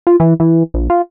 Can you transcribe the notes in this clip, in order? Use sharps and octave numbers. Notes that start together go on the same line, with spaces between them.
F4
E3
E3
A#1
F4